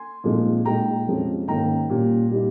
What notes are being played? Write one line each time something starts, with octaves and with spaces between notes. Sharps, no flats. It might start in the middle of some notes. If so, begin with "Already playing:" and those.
Already playing: G#5 C6
A#2 F3 G#3 C4 D#4
A#2 G#3 D#4 G5 A#5
F2 C3 F3 G#3 C#4
G#2 D#3 A#3 C#4 G5 A#5
A#2 G3 C#4
A#2 G3 A#3 D#4